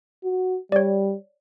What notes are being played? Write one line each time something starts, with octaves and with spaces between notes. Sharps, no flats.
F#4
G3 C#5 D5